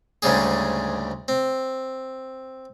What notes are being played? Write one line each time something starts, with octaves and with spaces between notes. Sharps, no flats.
D2 G#2 C#3 G3 G#4
C4